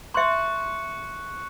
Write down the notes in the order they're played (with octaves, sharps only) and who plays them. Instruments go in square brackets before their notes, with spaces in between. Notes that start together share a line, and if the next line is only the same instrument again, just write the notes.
[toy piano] E5 C6 [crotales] C#6 F#6 C#7